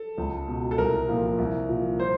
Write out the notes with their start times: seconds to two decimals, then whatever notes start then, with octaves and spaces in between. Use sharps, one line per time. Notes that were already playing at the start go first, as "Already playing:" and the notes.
Already playing: A4
0.18 C#2
0.48 B2
0.71 A4
0.78 C2 A#4
1.08 A#2 F3
1.38 C2
1.69 A#2 F3
2.00 C5